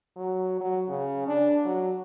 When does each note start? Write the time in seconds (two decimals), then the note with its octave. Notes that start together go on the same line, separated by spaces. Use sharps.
0.16 F#3
0.60 F#3
0.89 C#3
1.28 D4
1.65 F#3